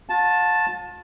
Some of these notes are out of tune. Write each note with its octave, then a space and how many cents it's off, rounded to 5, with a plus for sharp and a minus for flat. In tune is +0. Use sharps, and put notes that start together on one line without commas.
F4 +45 A5 +0